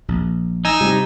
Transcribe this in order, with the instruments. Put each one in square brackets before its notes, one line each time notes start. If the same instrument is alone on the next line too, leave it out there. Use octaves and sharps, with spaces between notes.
[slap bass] A#1
[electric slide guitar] D#4 [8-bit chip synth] G#5 E6 A#6
[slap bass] C3 [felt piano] G3